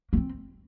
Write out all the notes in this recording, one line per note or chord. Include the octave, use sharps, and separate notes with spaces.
A#3
C4